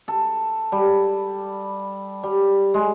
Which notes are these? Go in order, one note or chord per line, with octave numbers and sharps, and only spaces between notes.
A4
G3
G3
G#3